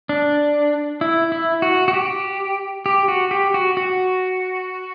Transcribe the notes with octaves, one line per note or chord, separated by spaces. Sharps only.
D4
E4
E4
F#4
F#4
G4
G4
F#4
G4
F#4
F#4